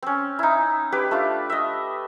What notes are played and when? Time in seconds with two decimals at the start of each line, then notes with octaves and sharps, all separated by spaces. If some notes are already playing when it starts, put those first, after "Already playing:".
0.02 C4 C#4
0.39 D#4 E4
0.92 G4 B4 D6
1.11 A3 D4 F4
1.50 D#5 E5